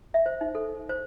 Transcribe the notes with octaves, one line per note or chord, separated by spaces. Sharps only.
E5
C5
D#4
A4
C5